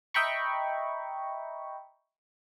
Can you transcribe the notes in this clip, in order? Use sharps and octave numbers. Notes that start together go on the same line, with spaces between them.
D#5 E5 G5 A#5 B5 C#6